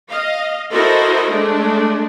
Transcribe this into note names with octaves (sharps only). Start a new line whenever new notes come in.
D#5 F5
E4 F#4 A4 A#4 C5 D#5
G#3 A3 D4